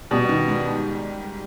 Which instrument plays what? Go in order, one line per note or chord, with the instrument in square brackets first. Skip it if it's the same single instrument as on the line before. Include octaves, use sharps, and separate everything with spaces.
[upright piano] B2 [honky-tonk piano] G3
[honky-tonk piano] D#3
G#2